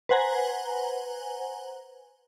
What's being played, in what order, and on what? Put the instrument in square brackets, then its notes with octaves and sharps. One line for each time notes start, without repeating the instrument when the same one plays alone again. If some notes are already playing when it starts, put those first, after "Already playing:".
[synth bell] B4 C5 F#5 G#5 A#5